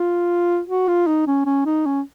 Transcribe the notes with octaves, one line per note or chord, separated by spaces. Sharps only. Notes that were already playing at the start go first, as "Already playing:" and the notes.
Already playing: F4
F#4
F4
D#4
C#4
C#4
D#4
C#4